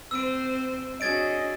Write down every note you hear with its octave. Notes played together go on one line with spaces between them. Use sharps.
C4 C5 E6 D7
D4 F#4 G#4 C#5 D#5 G#6 A6 D7